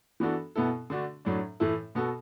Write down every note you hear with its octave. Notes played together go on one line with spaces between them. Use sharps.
E3 B3 D4 F#4 A4
B2 B3 E4 A4
D3 A3 D4 F#4
A2 F#3 D4
A2 E3 A3 E4 A4
B2 B3 F#4 A4